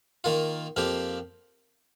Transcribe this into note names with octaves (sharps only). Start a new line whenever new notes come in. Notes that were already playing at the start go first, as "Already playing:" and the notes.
D#3 A#3 F4
F2 F3 A#3 G4